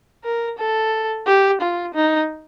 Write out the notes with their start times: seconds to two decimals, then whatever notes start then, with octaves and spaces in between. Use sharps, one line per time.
0.24 A#4
0.58 A4
1.27 G4
1.61 F4
1.94 D#4